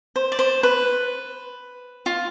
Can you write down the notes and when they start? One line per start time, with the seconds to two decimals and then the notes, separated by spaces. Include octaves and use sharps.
0.16 C5
0.32 D5
0.39 C5
0.63 B4
2.06 F4